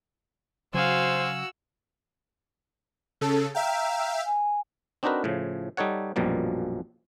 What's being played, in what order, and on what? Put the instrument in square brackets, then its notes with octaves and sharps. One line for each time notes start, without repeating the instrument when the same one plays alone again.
[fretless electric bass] C#3 F#3 [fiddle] F#4 E6 [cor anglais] C5 [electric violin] F5 G#5
[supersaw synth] C#3 A4
[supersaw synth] E5 F5 G5 [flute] A#5
[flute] G#5
[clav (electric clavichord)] C4 D4 D#4 F#4 A#4 B4
A2 C#3 F3
G3 D#4 A4 C#5 F#5
A#1 F#2 B2 F3 G3 A#3